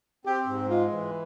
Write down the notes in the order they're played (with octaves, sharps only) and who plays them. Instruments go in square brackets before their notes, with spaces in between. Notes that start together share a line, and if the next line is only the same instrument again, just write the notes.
[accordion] C4 [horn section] G4
[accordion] G#2
[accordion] G#3 [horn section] F4
[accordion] E3